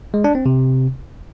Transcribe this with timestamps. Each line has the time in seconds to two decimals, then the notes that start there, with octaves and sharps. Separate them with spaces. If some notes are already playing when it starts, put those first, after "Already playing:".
0.14 G#3
0.24 D4
0.35 C4
0.46 C3